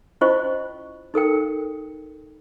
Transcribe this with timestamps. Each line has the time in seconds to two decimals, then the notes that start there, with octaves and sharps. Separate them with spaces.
0.21 C#4 E4 F4 C5 D#5 C#6
1.14 D#4 A4 A#4 G5